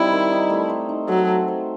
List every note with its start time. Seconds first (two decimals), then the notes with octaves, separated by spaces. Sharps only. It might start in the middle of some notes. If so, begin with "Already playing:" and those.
Already playing: G3 C4 D#4 E4
0.12 D#3
0.32 D#4
0.50 A3
0.69 C5
0.89 D#4
1.08 F#3 A4
1.28 A3
1.48 C5